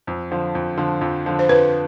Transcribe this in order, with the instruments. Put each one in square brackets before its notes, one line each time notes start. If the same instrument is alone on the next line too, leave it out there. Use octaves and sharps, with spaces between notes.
[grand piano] F2
D3 F3
F2
D3 F3
F2
D3 F3
[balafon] C5
[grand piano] F2 [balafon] B4